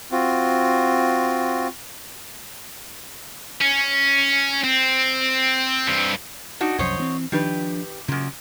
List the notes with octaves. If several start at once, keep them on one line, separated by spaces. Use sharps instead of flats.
C4 F4 F#4
C#4
C4
G2 C4
D4 D#4 F#4
C2 F#2 F3 C5 C#5 D#5
E3 B3 C4
D#3 F3 D4 G4 B4
F#2 A#2 C#3